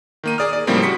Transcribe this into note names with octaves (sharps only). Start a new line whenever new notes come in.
D#3 A#3 D#7
G#4 D5 D#6 F6
D5
A2 C#3 F3 G3 A#3 C4
F#4 B6 C#7